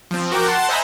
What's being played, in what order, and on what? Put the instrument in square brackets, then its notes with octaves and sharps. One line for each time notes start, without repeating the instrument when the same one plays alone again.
[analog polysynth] F3 C4
F#4 A#4 G5 D6
F#5 A5 C6 A6
C5 D#5 E5 G#5 A#5 B5